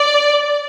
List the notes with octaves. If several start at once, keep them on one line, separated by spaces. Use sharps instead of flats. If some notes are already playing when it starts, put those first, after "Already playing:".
Already playing: D5